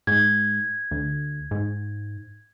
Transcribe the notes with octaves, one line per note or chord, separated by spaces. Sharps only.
G#2 G#6
D2
G#2